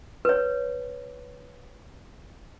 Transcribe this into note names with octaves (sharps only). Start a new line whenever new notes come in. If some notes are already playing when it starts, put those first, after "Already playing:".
B4 C#5